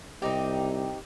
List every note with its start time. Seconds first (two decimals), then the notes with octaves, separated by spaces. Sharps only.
0.22 C2 C4 D#4 G4